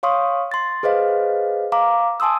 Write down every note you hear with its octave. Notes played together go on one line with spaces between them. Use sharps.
C#5 F5 C6 C#6 D#6
C6 A6
G#4 B4 C5 D#5 F5
F5 A#5 D6
G#5 A5 C6 D#6 E6